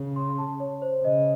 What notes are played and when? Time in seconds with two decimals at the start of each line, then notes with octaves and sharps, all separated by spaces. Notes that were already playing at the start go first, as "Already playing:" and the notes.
Already playing: C#3
0.16 C6
0.38 A5
0.60 C#5
0.82 C5
1.04 C#3 D#5